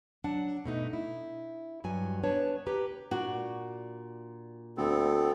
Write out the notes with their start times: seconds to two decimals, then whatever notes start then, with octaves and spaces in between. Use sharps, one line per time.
0.24 F#3 D4 F#5 A5
0.64 G2 B2 A3 D#4
0.93 E4
1.84 G2 F#3 G#5
2.23 B3 D4 B4 C#5 A5
2.67 G4 B4 A#5
3.11 A#2 D4 F#4
4.77 D2 B3 C4 A4